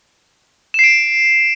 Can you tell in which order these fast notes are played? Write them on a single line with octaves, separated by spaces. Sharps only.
E7 C7 D7